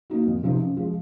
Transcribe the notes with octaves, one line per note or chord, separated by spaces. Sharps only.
A#3 D#4 F#4
F2
C3 F3 C4 D#4
F#2
F3 G#3